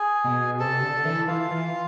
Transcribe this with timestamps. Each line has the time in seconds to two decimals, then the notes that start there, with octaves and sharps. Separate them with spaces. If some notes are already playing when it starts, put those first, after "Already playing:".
Already playing: G#4 G#5
0.24 B2
0.59 C3 A4 A5
0.82 D3
1.05 E3
1.27 E3 F4 F5
1.51 E3